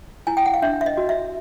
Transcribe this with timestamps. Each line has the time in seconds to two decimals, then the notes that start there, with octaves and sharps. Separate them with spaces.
0.27 E4 G#5
0.37 G5
0.46 F#5
0.54 F5
0.62 D4 E5
0.81 E5
0.86 D#5
0.97 F#4
1.09 E5